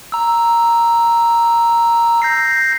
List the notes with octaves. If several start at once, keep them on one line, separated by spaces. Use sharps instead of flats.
A#5 E6
G6 A#6 C7